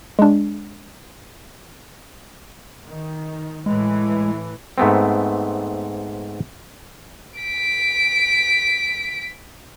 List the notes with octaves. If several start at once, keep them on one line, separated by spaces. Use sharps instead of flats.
G#3 D4
D#3
A2 E3 G#3
G#2 A3 B3 C4
B6 D7